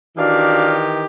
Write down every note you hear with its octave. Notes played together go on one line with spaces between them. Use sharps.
D#3 E3 D4 F#4 G4 F5